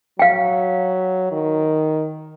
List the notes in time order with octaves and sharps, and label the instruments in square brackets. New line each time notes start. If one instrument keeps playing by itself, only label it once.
[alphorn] F#3 [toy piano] F5 G5
[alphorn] D#3